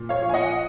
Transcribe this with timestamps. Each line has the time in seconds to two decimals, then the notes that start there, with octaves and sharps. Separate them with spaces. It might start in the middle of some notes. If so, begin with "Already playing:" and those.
Already playing: A#2
0.09 C#5 F5
0.21 F3
0.29 G#5
0.34 D#5 F#5